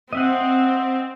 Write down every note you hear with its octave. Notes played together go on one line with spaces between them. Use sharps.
C4 D#5 E5 F#5